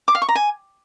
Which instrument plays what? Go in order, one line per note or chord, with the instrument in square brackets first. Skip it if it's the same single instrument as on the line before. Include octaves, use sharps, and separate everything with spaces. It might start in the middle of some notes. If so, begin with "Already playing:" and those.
[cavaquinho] D6
F5
C#6
A#5
G#5